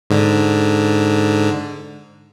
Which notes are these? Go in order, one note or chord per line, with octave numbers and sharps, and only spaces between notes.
G#2 D3